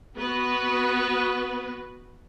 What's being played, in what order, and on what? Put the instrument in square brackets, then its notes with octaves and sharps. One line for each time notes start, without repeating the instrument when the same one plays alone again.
[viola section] B3 F#4 B4